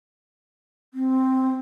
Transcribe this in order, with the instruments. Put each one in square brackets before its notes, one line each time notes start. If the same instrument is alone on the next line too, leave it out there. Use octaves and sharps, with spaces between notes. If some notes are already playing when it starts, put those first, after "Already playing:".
[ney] C4